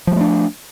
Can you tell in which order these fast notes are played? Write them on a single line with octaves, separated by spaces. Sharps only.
F3 G#3 A3 D4